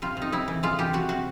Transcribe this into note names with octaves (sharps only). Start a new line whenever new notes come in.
C3 F4
C3 D#4
C3 E4
E3
G#3 F4
E3 G4
C3 F#4
C3 F#4